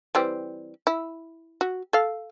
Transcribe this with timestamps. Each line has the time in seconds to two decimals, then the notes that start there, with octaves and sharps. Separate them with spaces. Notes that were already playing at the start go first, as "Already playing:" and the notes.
0.15 E3 G3 C4
0.87 E4
1.61 F#4
1.93 A4 F5